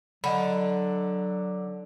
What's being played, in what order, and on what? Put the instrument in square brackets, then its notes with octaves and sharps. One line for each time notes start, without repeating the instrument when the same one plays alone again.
[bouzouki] D3 [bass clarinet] F#3 [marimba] D#5 F#5 B5